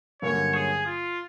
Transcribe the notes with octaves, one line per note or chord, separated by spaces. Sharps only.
G2 D3 F#3 A#3 C#4 C#5
G#4
F4